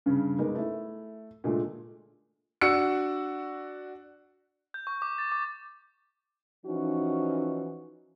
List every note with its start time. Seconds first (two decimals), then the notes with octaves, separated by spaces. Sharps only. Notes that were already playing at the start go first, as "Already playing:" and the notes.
0.06 G2 C#3
0.38 G#3 A#3 B3 D#4
0.55 A3 E4
1.44 A#2 D3 G#3 A3
2.61 D4 F#4 E6 C#7
4.74 G6
4.87 C#6
5.02 D6
5.18 A6
5.32 D6
6.65 E3 F3 C#4 D#4 F#4